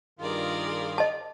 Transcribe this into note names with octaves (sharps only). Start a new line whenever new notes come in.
G2 D#3 F4 G#4 A#4 D5
D#5 A5